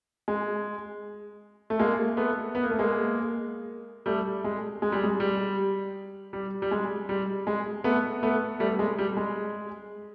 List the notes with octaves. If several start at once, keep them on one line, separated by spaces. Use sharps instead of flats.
G#3
A3
G#3 A#3
A3 B3
B3
A#3
A3
G#3 A#3
G3 A3
G#3
G#3
G3
G#3
G3
G3
G3
G#3
G3
G#3
A3 B3
A3 B3
G3 A3
G#3
G3
G#3